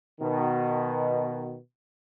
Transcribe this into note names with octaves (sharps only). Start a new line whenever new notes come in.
B2 D#3